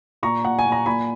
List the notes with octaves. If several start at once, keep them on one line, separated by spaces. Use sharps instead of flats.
A#2 A#5 C#6
A#2 F#5
G#5
A#2
A#5
A#2 G#5 B5